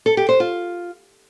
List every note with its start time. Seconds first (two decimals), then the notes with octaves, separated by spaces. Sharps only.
0.06 A4
0.17 G4
0.29 C5
0.40 F4